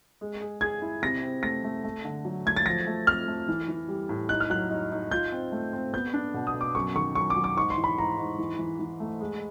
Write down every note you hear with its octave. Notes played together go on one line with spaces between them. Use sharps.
G#3
G#4
G#4 G#6
E4
C3 A#6
C4
A3 A#6
A3
A3
D3
F#3
A3 G#6
A6
F3 A#6
A3
F2 F6
A3
E3
E3
G3
A2
D#4 F#6
F6
F#3 F#6
D#4
D#4
F4 G6
C4
A3
C4
B3 G6
D4
B2
D#6
B2
D6
F#2 C#6
D#3 C#6
F#2 C#6
D6
F#3
D6
G#2 C#6
C6
E3
B5
G#2 A#5
G#2
E3
E3
E3
A3
G#3